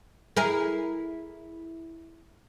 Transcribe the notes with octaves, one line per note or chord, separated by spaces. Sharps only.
E4 G#4 A#4